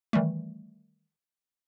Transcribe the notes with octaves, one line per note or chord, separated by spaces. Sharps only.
D#3 E3 G3 A3